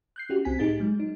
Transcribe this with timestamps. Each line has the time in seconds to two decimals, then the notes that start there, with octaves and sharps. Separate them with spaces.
0.16 F#6 G6 C7
0.29 C#4 E4 F#4 G4
0.45 C2 C4 G#5 B6
0.59 A2 D#4 G4 G#4 G#5 A6
0.80 F#3 G#3
1.00 D#4